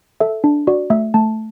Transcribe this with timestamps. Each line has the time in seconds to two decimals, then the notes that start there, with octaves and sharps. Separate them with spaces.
0.20 A4 E5
0.44 D4
0.67 F#4 D5
0.90 A3 E5
1.14 A3 A5